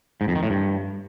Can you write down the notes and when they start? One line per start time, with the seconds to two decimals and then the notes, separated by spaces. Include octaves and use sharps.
0.21 G#2
0.28 F2
0.35 D#3
0.43 A2
0.50 G2